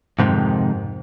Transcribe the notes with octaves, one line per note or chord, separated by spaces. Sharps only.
F2 G#2 C3 D#3